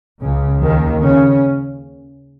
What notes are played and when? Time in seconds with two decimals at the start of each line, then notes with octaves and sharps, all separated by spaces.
0.21 C#2 C#3
0.62 D#2 D#3
1.03 C#3 C#4